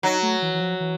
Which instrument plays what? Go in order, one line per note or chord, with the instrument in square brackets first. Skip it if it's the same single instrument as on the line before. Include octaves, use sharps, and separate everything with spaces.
[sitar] F#3 [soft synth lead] D#4
[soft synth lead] A3
E3
E3
F3
E3